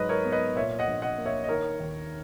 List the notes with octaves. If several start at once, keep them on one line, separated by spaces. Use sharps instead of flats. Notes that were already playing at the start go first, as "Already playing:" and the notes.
Already playing: G#2 F#3 B4 D#5
A#4 C#5
B3
B4 D#5
A#2 C#5 E5
D#5 F#5
A#1
D#5 F#5
A#3
C#5 E5
D#5
D#3 A#4 C#5
D#2